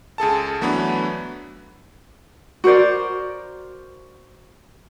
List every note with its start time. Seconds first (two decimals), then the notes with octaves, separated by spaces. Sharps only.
0.18 C#2 G#4 A4 A5
0.61 E3 F#3 A3 B3 D4 B4
2.64 F#4 A#4 C5 D5